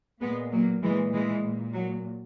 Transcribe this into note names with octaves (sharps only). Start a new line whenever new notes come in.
A#2 G#3 B3
F#3 A#3
A#2 E3 G#3
E3 G#3
A#2
F#3